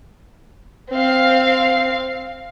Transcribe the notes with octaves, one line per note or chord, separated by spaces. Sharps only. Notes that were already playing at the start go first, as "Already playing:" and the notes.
C4 F5